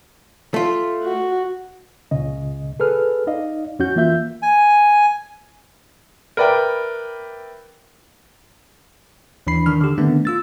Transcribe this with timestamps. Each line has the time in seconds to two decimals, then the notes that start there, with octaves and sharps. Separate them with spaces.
0.54 A3 F4
1.03 F#4
2.11 C#2 A#2 C#3 D#5
2.80 G#4 A4 B4 F6
3.27 D#4 D5 D#5 F5
3.79 F2 C#4 F#4 G6
3.96 E3 A#3 F4 E5 G6
4.42 G#5
6.37 A#4 B4 D5 E5 G5 B5
9.47 D#2 E3 D4 B5 C7
9.66 D#3 D4 F6
9.81 D3 G4
9.98 D3 D#3 A3 B3 C4 D4
10.25 F4 E6 A6